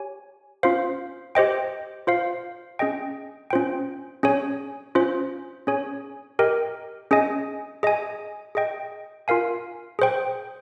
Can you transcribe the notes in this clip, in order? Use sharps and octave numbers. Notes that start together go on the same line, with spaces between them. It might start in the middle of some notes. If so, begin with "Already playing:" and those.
Already playing: G4 C#5 G#5
C#4 F4 C5 F5
G4 C5 D#5 G5
F4 C5 F5
C#4 G#4 D#5 G5
C#4 F4 C5 G5
C#4 G#4 C#5 G#5
C#4 F4 C5
C#4 G#4 C#5 G#5
G4 A#4 D#5 G5
C#4 G#4 D#5 G#5
G#4 D#5 G#5
G#4 D#5 G5
F4 A#4 F5 G#5
G#4 C5 G5